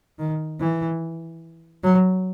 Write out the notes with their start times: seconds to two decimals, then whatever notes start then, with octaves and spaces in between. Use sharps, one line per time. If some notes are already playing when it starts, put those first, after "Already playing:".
0.19 D#3
0.60 E3
1.83 F#3